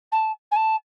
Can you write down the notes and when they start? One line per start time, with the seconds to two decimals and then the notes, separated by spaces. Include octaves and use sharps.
0.12 A5
0.51 G#5
0.56 A5